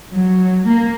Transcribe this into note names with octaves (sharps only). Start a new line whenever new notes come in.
F#3
A#3